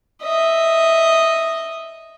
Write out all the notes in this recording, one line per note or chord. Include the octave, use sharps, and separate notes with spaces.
D#5 E5